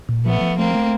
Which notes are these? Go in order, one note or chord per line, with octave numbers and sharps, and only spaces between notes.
A#2
F3 A3 B3
F3
A3 A#3 C4
A3